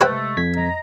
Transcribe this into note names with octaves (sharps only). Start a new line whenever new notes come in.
C3 G#3 A3 B4 C5 G5
F2 G#6 B6
D#5 A#5